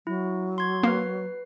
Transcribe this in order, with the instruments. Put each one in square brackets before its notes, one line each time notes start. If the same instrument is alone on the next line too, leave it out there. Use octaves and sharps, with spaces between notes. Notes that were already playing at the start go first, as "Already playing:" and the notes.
[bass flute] F#3 [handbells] E4
[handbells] C6 G#6
[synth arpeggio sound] A#3 [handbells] B4 C7